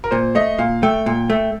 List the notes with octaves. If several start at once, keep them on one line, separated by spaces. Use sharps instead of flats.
A#4
A#2 C5
A3 D#5
A#2 F5
A3 G5
A#2
A3